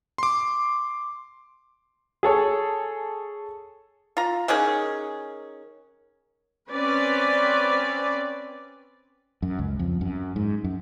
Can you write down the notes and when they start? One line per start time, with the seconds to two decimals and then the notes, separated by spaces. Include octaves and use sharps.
0.18 C6 D6
2.23 G#4 A4 C#5
4.17 F4 A#5
4.48 D#3 F#3 C#4 G#4
6.70 C4 C#4 B4 D5
9.42 F#2
9.59 C#2
9.79 F2
10.01 F#2
10.36 G#2
10.64 F#2